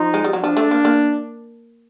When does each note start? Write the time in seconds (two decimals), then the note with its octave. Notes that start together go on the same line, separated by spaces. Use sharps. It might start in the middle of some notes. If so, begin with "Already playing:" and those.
Already playing: F3 D#4
0.14 G#3
0.24 G3
0.33 F#3
0.43 F3 D4
0.57 A3
0.71 A#3
0.85 A#3